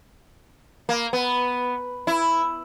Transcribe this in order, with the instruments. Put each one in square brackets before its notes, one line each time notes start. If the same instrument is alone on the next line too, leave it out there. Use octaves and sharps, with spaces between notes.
[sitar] A#3
B3
E4